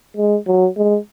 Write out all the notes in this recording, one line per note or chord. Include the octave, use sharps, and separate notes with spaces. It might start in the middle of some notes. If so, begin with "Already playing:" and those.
G#3
F#3
G#3